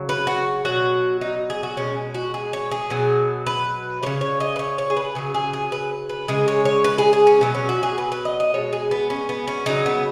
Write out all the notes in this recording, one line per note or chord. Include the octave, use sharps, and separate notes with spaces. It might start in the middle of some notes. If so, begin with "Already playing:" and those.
Already playing: C#3 F#3
B4
F#4
B2 F#3 F#4
D#4
G#4
F#4
B2 G#3 C#4
F#4
G#4
C#5
G#4
B2 F#3
B4
C#3 F#3 C#5
C#5
D#5
B4
C#5
C#5
G#4
B4
C#3 F#3 G#4
G#4
G#4
B4
B4
C#3 G#3 G#4
C#5
C#5
B4
G#4
G#4
C#4
B2 F#3 B3
C#4
F#4
G#4
B4
B4
D#5
D#5
B2 G#3 C#5
G#4
B3
C#4
B3
C#4
C#3 F#3 D#4
B3